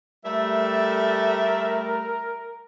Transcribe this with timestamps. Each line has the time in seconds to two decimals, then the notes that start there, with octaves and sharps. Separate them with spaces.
0.25 G3 A3 A#4 E5